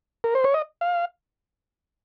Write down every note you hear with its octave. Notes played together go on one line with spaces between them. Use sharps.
A#4
C5
C#5
D#5
F5